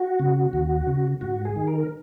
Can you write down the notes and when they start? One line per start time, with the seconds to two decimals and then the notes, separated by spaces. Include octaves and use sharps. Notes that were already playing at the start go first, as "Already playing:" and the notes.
Already playing: F#4
0.19 C#3
0.53 D#2
0.87 C#3
1.21 G#2 F#4
1.45 G#4
1.56 D#3
1.67 A#4